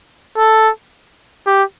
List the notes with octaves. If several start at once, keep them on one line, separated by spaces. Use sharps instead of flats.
A4
G4